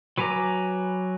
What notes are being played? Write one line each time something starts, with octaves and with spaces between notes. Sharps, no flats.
F#3 B4 G#5 A#5 D6